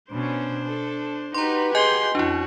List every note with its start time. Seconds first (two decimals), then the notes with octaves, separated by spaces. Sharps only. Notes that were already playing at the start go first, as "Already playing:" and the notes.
0.11 B2 C#4 D4 C5
0.66 A4
1.34 D#4 F#4 G4 B4 A#5 C6
1.75 G#4 D#5 G#5 C6 G6
2.15 F2 C#4 D4 E4 F#4